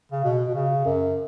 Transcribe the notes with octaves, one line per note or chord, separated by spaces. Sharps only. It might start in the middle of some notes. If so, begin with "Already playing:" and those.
C#3
B2
B2
C#3
F#2